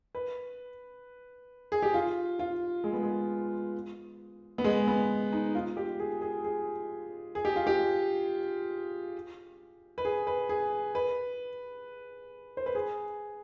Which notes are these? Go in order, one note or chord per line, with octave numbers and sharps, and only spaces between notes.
B4
G#4
G4
F4
F4
G#3
B3
G#3
B3
G#3
B3
D#4
F4
G4
G#4
G#4
G#4
G#4
G4
F4
G4
B4
G#4
B4
G#4
B4
C5
B4
G#4